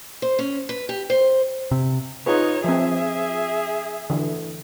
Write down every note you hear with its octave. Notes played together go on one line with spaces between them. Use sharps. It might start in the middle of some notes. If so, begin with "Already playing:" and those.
C5
C#4
B4
G4
C5
C3
D#4 F4 G#4 B4 C#5
F3 C4 G#4 E5
D3 E3 D4